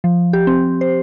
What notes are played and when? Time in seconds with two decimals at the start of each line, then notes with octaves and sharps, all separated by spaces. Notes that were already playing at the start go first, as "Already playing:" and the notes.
0.04 F3
0.33 G4
0.47 C4
0.81 C5